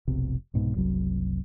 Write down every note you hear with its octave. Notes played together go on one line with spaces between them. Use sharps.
F1 B1 C3
C2 G#2 B2
F#1 C2 F#3